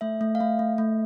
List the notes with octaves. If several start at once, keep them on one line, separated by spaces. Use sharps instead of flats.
A3 E5
A3
F5
A3 E5
A3
A3